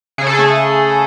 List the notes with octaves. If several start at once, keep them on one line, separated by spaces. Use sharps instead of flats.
C#3 G#4
A4
G#4
A3